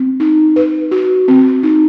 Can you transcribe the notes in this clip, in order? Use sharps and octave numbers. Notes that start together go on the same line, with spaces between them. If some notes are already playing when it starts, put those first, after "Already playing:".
Already playing: C4
D#4
B4
F#4
C4
D#4